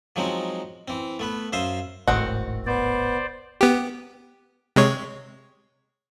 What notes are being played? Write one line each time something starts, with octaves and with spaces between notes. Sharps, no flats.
F3 F#3 G#3 C4 D#4
E3 C4
A3 B3 B4
F#2 C5 E5 F5 C6 D#6
D#1 G#1 A2 D#3 C4 F#4
B3 C5 D5
B3 G4
C3 G#3 C#5